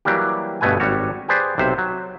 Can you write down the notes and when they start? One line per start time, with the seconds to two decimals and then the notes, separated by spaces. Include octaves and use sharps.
0.05 E3 F#3 G3 A#3 G4
0.61 G1 G2 B2 A3 B4 G#5
0.80 G#1 G3 F#4 C#5
1.28 G4 G#4 B4 C5 D5
1.58 B1 C3 C5 E5
1.78 F#3